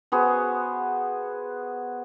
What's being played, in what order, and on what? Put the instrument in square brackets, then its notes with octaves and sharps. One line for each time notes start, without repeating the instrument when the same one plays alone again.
[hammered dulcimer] B3 F#4 G#4 C5